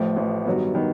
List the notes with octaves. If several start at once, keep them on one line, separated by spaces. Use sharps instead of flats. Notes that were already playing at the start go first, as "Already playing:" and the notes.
Already playing: A1 A2 F3
A1 A2 F3
G2 D#3 F#3 B3
D#3 F#3 B3